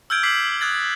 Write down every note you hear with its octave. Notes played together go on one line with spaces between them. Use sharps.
E6 F6 G6 G#6 D7
D6 B6 C7 F#7
D#6 F#6 G#6 A6